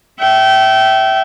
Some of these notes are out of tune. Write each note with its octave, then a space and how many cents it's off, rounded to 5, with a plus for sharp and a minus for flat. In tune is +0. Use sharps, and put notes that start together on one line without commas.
E5 +0 G5 -25